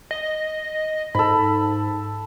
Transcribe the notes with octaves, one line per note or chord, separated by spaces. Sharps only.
D#5
G#2 A4 B5